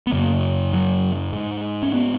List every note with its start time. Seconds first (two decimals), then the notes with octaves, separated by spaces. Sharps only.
0.07 B3
0.12 F#2 C#3 A#3
0.73 F#3
1.33 G#2
1.83 C#4
1.93 B3